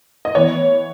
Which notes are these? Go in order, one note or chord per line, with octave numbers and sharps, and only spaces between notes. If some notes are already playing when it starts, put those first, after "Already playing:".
D#5
E3 B3 C#5